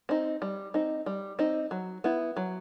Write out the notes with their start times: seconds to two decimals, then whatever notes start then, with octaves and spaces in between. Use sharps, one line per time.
0.09 C4 D#4
0.42 G3
0.74 C4 D#4
1.06 G3
1.39 C4 D#4
1.71 F#3
2.04 B3 E4
2.37 F#3